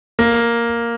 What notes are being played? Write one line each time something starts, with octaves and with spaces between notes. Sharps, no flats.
A#3